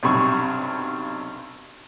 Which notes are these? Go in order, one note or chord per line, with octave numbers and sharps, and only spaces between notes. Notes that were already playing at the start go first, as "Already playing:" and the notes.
B1 G2 C3 B5 C#6